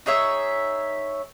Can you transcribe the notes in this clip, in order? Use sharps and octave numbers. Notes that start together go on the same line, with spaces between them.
D#4 G#4 C#5 E5